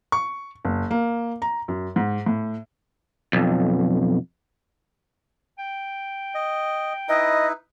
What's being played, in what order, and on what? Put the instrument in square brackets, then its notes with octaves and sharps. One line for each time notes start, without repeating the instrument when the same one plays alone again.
[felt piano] C#6
F#1
A#3
A#5
F#2
G#2
A2
[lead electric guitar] B1 F2
[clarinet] G5
[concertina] D#5
[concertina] D#4 E4 B4 [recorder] D#5